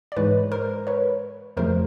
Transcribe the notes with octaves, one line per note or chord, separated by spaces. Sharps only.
D5
G#2 E3 G#3 B4 C#5
A#4 C5
B4 C#5
F2 C#3 F3 A3 A#4 C5